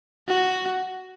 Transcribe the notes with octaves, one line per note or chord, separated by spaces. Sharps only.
F#4